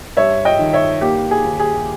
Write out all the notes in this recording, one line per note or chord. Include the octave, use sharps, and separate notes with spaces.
G2 C#5 E5
D#5 G5
D#3
C#5 E5
A#3 G4
G#4
D#2
G#4